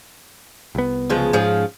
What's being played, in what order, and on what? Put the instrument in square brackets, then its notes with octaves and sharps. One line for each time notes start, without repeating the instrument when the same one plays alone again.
[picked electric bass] C2 B3
[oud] C#3 F3 G#3
[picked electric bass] G#2 [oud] F3 C#4 G#4